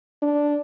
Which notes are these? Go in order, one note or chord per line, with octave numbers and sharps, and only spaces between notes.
D4